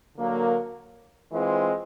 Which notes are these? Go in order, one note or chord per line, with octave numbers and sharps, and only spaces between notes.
D3 F#3 A#3
E3 G#3 C4 F4